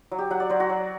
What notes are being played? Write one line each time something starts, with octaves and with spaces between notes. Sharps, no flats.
F#3
G4
F#3 F#5
D5
F#3 C5
F#4
F#3